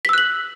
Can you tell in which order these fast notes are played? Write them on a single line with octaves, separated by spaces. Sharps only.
B6 E6 F#6 F#7